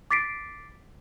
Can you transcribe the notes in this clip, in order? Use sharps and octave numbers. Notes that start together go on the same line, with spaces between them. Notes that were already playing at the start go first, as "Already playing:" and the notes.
D6 A6 B6 C7 D7